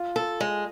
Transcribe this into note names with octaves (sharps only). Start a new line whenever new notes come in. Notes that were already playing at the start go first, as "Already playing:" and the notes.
Already playing: F4
A4
G#3